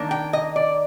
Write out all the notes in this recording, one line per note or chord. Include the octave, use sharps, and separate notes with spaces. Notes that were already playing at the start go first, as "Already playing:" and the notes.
Already playing: D#3 A#3 D4
G5
D#5
D5